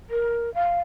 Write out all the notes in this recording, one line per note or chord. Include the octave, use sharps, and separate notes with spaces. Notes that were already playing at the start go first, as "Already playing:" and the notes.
A#4
F5